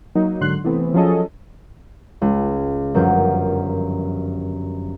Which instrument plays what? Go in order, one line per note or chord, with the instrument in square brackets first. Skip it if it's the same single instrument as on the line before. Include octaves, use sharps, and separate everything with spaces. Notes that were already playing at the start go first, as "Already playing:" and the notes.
[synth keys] F#3 A#3 D#4
G#2 D3 F#3 C6 F#6
C3 E3 A3 B3 C4
F3 F#3 C#4 G#4 A4 D#5
[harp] C#2
G1 F#2 F3 A#4 G6